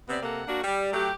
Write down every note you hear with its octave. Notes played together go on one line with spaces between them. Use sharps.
C3 B3 C4 D5
C3 A#3 A4 F#5
A#3 D4 F#4
G3
F#3 A3 G4